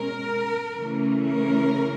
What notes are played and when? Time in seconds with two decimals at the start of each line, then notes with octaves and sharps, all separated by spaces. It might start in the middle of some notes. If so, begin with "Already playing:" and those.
Already playing: B2 G#3 C#4 A#4
0.75 C#3 E3 A3 C#4
1.24 A#4